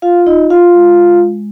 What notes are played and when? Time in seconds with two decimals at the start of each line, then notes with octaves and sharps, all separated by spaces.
0.02 F4 F5
0.27 D#4 D#5
0.39 F4
0.50 F4 F5
0.74 G#3
1.10 G#3